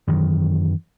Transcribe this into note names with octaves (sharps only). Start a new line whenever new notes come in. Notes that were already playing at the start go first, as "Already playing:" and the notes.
F#2 D#3 E3